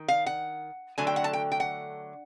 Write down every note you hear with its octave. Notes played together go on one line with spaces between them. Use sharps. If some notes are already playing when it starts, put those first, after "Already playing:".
Already playing: D#3
F5
F#5
D3 F#3 A3 G#5
G5
F#5
A5
G5
G5
F#5